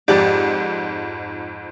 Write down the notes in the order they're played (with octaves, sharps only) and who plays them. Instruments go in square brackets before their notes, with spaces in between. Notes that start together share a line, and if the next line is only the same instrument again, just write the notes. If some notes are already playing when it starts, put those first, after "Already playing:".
[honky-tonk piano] F2 G#2 [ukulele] G4 D5